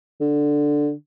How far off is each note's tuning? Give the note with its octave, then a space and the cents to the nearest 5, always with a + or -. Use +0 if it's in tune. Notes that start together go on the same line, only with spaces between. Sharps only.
D3 +0